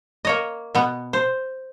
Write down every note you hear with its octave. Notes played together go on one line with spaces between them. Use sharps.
A#3 C#5 D#5
B2 B3
C5